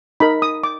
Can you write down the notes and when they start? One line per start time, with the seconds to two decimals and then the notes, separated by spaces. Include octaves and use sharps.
0.20 D#4 A#4 B5
0.42 D#6
0.64 D6